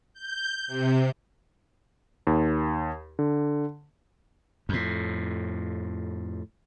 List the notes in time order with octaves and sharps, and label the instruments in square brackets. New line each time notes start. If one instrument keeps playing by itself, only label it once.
[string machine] G6
C3
[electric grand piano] D#2
D3
[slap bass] F2 A2